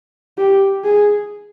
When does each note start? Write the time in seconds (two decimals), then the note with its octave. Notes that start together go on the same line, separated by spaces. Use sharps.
0.38 G4
0.84 G#4